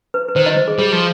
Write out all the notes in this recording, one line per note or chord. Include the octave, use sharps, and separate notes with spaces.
B4
B4
D#3 C5
D#5
C5
G#4
G3 G#4
F3